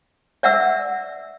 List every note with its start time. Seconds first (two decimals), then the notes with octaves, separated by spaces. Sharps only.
0.43 D5 E5 F#5 E6